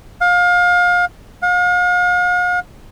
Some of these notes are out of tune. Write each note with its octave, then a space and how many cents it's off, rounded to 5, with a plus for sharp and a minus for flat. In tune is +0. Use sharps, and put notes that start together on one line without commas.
F5 +30
F5 +45